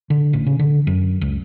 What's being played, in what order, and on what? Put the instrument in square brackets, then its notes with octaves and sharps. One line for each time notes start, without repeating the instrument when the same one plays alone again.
[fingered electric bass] D3
A1
C#3
D3
F#2
C#2